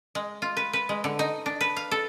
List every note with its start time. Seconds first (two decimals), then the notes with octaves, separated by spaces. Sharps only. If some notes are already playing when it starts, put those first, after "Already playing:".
0.15 G#3
0.42 F4
0.57 B4
0.73 B4
0.89 G#3
1.04 D3
1.19 D#4
1.46 D4
1.61 B4
1.76 F5
1.91 A4